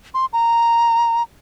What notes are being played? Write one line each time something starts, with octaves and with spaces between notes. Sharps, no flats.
C6
A#5